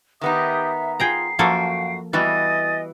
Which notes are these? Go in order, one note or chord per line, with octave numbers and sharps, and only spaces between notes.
D#3 B3 D#4 G4 E5 D#6
F4 G#4 G5 A#5 C7
F#2 F3 A#3 F#4 A4 F5 G5
E3 G3 B3 F#4 D#5 G#5 D#6 A6